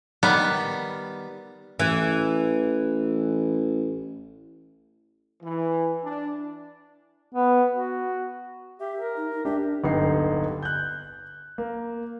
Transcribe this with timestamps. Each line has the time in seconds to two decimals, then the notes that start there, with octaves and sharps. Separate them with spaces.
0.23 D#3 G3 B3
1.80 A1 E3
5.43 E3
6.04 D4
7.34 B3
7.72 F#4
8.80 G4 E5
8.98 A#4
9.17 D#4
9.31 D#4
9.45 D4 G4 E5
9.83 D1 G1 D3 D#4 G5 C7
10.62 F#6 G6
11.58 A#3